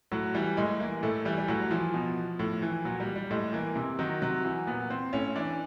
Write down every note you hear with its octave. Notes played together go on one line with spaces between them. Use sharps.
A2 F#3
E3 G3
A2 G#3
E3 A#3
A2 A3
E3 G3
G3
A2 F#3
E3 F3
B2
A2
E3
A#2 F#3
G3
G3
A2 G#3
E3 A#3
C3
D#3 F#3
C3 F#3
E3 F#3
A#2 B3
C4
A2 C#4
E3 D4